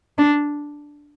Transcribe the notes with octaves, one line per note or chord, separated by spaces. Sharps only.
D4